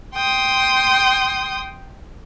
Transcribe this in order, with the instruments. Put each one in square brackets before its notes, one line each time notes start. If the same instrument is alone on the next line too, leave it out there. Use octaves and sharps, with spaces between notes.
[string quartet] G5 C6 D#6